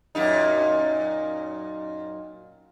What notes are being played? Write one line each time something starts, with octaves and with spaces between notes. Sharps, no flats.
F#2 A#2 D#4